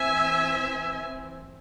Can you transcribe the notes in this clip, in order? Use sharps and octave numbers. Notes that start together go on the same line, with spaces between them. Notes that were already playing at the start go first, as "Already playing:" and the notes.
Already playing: E3 C4 E5 G#5